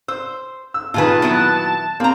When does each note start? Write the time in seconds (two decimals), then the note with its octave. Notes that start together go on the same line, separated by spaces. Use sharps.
0.08 C5 E6
0.74 E6
0.94 A#2 D#3 F4 G#4 B4 A5
1.22 F#3 B3 E4
2.00 A#3 C4 A#5